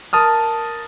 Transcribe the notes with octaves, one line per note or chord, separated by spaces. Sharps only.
A#4 A5 D#6 F6